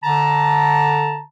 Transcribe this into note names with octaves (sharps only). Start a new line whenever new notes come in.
D3 A5 A#5